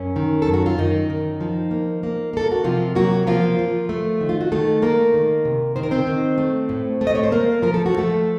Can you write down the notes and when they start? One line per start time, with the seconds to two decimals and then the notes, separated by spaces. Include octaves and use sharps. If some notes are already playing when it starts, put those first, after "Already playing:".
Already playing: F#2 C#4
0.16 D#3
0.42 F#2 A4
0.53 F#4
0.66 F4
0.78 F#2 D#3 D#4
1.10 D#3
1.41 F3
1.71 A#3
2.03 A#3
2.33 A#3 A4
2.51 F#4
2.64 C3 F3 F4
2.95 F#3 A#3 F#4
3.27 F3 A#3 F4
3.59 F3
3.89 A3
4.21 D#3
4.29 F4
4.41 F#4
4.52 D#3 A3 A4
4.82 A3 A#3 A#4
5.14 D#3
5.45 C3
5.76 D#3 C5
5.83 A#4
5.91 C4 C5
6.07 D#3
6.38 A3
6.69 A2
7.01 A3
7.07 D#5
7.15 C#5
7.23 C5
7.32 A3 A#3 A#4
7.62 F3 A#4
7.74 A4
7.86 F#4
7.94 F3 A3 A4